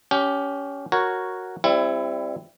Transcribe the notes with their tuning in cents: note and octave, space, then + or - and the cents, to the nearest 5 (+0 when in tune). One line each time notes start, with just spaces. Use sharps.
C#4 +20 G4 -5
F#4 +0 A#4 +0 C#5 +0
G3 +25 C4 +0 E4 +20